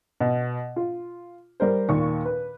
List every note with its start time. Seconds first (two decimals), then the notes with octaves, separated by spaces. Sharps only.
0.21 B2
0.76 F4
1.60 G3 A#4 C5
1.89 D#2 A#2 C#6
2.25 B4